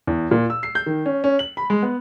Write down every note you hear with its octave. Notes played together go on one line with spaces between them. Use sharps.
E2
A#2
E6
C7
G6
D#3
C#4
C#4
F#7
B5
G#3
B3